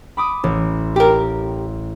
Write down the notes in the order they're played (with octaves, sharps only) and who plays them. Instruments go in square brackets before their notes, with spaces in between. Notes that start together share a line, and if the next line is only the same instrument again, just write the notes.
[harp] B5 D6 D#6
A1
[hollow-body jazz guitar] G4 A#4